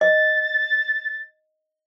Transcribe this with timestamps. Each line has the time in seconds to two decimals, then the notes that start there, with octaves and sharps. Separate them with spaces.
0.01 D#5 A6